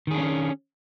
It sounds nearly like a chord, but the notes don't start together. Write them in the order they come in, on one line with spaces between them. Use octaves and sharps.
D#3 G#4 D4 C#4